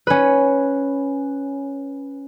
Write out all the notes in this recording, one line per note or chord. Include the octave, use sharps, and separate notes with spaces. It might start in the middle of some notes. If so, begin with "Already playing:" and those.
C#4 B4